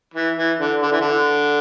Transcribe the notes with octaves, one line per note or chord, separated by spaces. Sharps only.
E3
E3
D3
D3
E3
D3